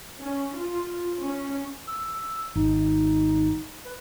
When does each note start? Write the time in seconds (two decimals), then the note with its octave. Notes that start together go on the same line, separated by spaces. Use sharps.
0.20 C#4
0.56 F4
1.20 C#4
1.87 E6
2.56 G#1 D#4
3.85 B4